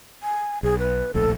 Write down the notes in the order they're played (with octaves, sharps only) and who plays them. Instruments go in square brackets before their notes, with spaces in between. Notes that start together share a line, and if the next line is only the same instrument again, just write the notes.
[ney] G#5
[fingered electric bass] B1 [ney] G#4
[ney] B4
[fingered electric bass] D1 A#1 A2 [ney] A4